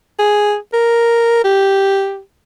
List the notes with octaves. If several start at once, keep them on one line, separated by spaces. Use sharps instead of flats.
G#4
A#4
G4